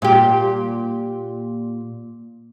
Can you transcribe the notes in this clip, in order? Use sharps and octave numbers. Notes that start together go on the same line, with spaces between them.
A#2 G4